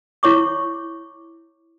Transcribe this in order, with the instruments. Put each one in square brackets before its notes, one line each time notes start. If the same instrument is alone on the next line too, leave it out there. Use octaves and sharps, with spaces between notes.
[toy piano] E4 C#5 C#6 D6